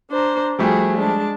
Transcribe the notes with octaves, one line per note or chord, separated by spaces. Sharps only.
D4 C5 A#5
F3 G3 A3 F#4 G#4
G#3 D4 A5